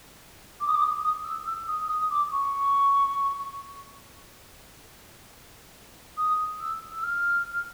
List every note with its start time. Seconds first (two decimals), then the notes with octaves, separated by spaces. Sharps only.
0.60 D6
0.67 D#6
0.74 D6
0.82 D#6
1.03 D#6
1.24 E6
1.45 E6
1.67 D#6
1.88 D#6
2.10 D6
2.31 C#6
6.17 D#6
6.60 E6
6.92 E6
7.03 F6